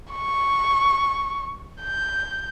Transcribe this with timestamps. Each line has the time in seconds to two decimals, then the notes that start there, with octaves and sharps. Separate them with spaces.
0.12 C#6
1.83 G6